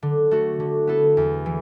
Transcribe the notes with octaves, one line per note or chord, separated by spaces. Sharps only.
D3
A3 F#4
D3
B3 E4 A4
E2
E3